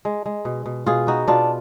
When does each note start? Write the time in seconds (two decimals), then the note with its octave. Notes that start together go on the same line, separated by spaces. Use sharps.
0.05 G#3
0.26 G#3
0.45 B2
0.66 B2
0.86 B2 F4 G#4
1.07 B3 D#4 F#4
1.28 B2 D4 F4